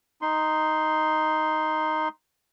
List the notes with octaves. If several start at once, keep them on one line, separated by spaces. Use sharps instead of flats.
D#4 C6